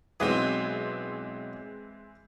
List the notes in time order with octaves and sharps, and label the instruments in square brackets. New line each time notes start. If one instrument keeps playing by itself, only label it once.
[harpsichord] B1 D#6 [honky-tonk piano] E3 G#3 C4